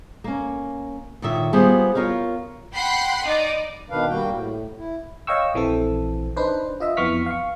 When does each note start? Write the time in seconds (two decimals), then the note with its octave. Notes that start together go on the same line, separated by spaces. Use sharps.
0.24 A#3 C#4
1.22 A#2 D#3 C#5 E5
1.53 G3 B3 F4 G#4 C5
1.95 F4 A#4 C#5 F5
2.73 F#5 G5 B5 C6 F#6 C7
3.24 D#4 D5
3.90 B2 D#3 D4 B4 F5
4.09 G3 A#3 F#4 G5
4.30 A2
4.77 E4
5.27 C#5 D#5 F5 G5 C#6 E6
5.54 A#1 E3 C4 A4
6.37 D4 D#4 B4 C5
6.80 F4 D#5 E5
6.97 F2 E3 B3 C#6 F6 B6
7.26 F5 C#6